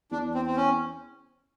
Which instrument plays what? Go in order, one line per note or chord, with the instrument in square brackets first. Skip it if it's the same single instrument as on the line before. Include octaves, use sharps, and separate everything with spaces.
[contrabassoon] E2 [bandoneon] D4
[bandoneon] C4
C4
C#4